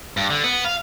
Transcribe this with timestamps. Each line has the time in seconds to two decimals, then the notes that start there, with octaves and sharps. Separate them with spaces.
0.17 G2
0.30 D3
0.44 B3
0.65 F5